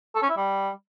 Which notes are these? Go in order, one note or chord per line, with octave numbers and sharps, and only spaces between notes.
A4
C#4
E4
G3